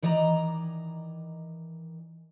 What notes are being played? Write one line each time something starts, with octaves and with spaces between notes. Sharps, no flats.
D#3 E3 D5 D#5 G#5 A#5